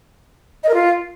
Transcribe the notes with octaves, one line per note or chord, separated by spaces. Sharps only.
D#5
A#4
F4